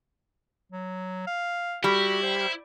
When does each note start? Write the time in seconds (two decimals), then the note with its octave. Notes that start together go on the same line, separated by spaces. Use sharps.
0.72 F#3
1.27 F5
1.84 G3 E4 F#4
2.23 C5